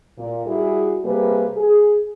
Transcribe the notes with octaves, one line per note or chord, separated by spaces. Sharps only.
A#2
G3 E4 F#4 G#4
C3 G3 A#3 G#4 A#4 B4
G#4